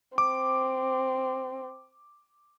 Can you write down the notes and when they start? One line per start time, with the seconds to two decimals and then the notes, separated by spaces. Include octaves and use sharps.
0.18 C4 D6